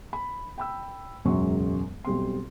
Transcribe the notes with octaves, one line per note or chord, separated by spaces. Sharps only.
B5
G5 B5 E6
E1 C#2 F#2 F#3 C6 C#6
B1 G3 C4 C6